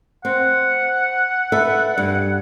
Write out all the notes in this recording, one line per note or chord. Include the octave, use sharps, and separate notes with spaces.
C4 F#5
A4 B4 E5
G2